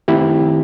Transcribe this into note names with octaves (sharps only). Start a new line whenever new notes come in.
D#3 A3 C4 E4 G4